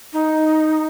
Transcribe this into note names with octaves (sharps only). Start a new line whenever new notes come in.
D#4